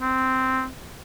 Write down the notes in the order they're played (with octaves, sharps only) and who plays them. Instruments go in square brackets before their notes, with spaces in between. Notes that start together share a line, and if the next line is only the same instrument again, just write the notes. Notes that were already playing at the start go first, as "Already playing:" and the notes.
[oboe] C4